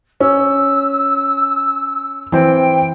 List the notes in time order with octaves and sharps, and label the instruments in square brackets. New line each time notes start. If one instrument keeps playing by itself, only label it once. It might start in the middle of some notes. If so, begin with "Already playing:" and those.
[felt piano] C#4 [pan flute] E6
[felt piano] E3 C4 [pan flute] G5